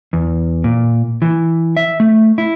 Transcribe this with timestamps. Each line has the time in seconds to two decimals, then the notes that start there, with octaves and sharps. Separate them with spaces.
0.13 E2
0.64 A#2
1.22 E3
1.77 E5
2.00 A3
2.38 E4